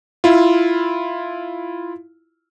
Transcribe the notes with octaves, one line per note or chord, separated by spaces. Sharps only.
E4 F4